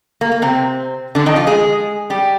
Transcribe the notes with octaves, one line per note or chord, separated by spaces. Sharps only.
A#3
A#3
C3 C4
D3 D4
D#3 D#4
F3 F4
G#3 G#4
G3 G4